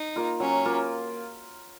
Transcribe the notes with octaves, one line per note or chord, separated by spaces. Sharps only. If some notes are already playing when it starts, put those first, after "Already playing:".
Already playing: D#4
A#3 F4
F#3 C#4
A#3 F4